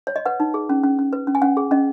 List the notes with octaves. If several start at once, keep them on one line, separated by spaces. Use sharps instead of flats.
C#5
D#5
B4 F#5
D#4
G#4
C#4
C#4
C#4
B4
C#4
G#5
C#4 F#5
G#4
C#4 D#5